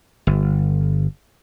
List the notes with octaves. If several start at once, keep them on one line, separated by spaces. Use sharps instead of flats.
G1